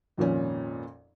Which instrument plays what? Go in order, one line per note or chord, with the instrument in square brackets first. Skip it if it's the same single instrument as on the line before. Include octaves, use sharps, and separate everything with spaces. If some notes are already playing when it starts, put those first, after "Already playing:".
[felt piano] G#1 F2 A#2 C#4